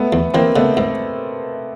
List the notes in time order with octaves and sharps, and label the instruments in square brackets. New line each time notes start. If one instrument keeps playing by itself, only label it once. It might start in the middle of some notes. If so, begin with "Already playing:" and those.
Already playing: [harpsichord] G#3 [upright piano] A3 B3
[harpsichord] E2
[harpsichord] E3 [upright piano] A#3 C4
[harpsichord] C#3 [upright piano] A3 B3
[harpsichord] G#2